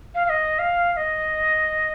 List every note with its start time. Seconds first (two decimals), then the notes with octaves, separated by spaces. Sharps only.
0.15 F5
0.26 F5
0.29 D#5
0.59 F5
0.93 F5
0.97 D#5